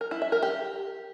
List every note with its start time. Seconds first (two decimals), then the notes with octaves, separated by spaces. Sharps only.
0.01 A#4
0.11 E4
0.22 E5
0.32 A#4
0.43 G4